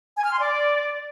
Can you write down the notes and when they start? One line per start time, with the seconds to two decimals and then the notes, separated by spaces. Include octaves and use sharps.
0.17 G#5
0.25 F6
0.32 C6
0.40 D5